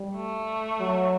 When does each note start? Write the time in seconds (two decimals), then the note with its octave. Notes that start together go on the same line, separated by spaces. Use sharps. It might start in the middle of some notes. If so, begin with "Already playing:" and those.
Already playing: G3
0.15 A3
0.81 F#3